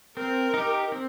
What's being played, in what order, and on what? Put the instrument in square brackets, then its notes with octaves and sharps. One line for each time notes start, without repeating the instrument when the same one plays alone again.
[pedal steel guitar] C4 [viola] A#4
[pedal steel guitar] D#4 G4
C4